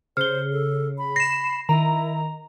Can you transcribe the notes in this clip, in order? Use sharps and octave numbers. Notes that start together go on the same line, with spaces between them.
C#3 C5 F6 G7
A4
B5
A#6 C7 E7
D#3 E4 A#5